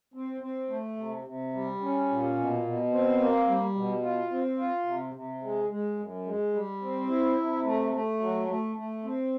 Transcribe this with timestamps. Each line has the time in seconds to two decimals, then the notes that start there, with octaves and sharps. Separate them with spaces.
0.14 C4
0.41 C4
0.69 A3
0.97 C3
1.25 C3
1.53 G3
1.81 C#4
2.09 A#2
2.36 B2
2.64 B2
2.91 C4
3.20 A#3
3.47 G3
3.75 B2
4.02 F4
4.31 C4
4.58 F4
4.86 C3
5.14 C3
5.42 G#3
5.70 G#3
5.98 F#2
6.26 G#3
6.53 G3
6.81 C4
7.08 E4
7.37 C3
7.64 A3
7.93 A3
8.20 F#3
8.48 A3
8.76 A3
9.03 C4